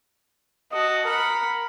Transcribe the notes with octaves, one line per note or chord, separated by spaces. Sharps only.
F#4 D#5 A5
A#4 F#5 B5